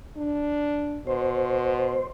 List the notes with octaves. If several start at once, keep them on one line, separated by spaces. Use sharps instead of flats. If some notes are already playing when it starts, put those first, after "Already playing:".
D4
B2 C5